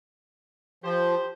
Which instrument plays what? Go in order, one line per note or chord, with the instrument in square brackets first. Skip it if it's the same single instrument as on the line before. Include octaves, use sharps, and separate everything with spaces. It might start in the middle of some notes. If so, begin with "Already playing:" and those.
[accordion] F3 [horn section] G4 C5